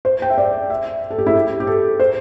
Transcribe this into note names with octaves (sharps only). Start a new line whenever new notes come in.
C5
G5
E5
D5
E5
A4
G4
E4
G4
G4
A4
C5